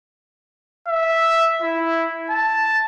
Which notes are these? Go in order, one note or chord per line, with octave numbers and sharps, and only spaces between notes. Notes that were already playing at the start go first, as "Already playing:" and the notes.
E5
E4
A5